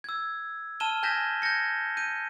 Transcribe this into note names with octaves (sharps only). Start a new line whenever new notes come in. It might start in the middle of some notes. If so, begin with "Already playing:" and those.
E6 G#6
A5 F6 D#7 E7 G7
G#5 G6 G#6 A#6 B6 E7
G6 G#6 A#6 C#7
G6 D#7